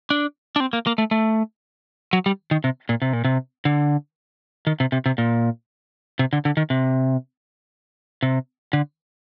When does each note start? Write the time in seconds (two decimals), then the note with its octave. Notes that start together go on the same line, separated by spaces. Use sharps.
0.10 D4
0.56 D4
0.60 C4
0.73 A#3
0.87 A#3
0.98 A3
1.11 A3
2.13 F#3
2.26 G3
2.51 D#3
2.64 C3
2.89 A#2
3.02 C3
3.13 A#2
3.25 C3
3.65 D3
4.67 D#3
4.80 C3
4.92 C3
5.06 C3
5.18 A#2
6.19 C3
6.33 D3
6.45 D3
6.57 D#3
6.70 C3
8.23 C3
8.73 D3